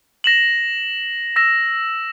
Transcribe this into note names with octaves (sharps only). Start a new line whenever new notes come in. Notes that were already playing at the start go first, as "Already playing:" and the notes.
A#6 E7 F#7
E6 A#6 E7